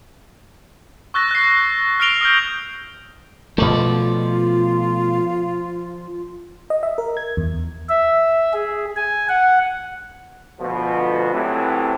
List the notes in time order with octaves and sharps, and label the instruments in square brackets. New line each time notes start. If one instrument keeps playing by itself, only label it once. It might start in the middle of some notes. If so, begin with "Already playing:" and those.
[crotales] C#6 E6 F#6 A6 A#6
F#6 C7
F6 A#6 C7 D7 F7 G7
D#6 F6 G6
[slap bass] B2 A3 [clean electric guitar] F3 D5 [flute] F4
[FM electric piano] D#5
E5
A#4
G#6
E2
[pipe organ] E5
G#4
G#5
F#5
[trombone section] D2 B2 F3
E2 A2 C3 E3 F#3 C4